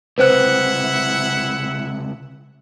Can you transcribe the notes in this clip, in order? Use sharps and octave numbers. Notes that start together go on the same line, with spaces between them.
C#2 C3 E4 B4 C5 E5 F#5 F#6